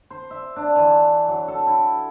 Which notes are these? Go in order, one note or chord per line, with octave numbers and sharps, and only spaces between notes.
C5
E5
D4
E3
E4
F#3
A4
E4